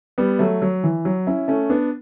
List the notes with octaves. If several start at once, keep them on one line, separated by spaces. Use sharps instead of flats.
G3 B3
F#3 A3
F#3
E3
F#3
C#4 E4
A3 C#4
B3 D4